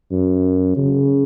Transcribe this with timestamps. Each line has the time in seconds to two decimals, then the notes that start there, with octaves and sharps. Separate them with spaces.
0.12 F#2
0.77 C#3